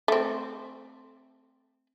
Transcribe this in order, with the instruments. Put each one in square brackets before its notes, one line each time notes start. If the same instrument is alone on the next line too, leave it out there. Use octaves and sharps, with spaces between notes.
[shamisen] A3 C4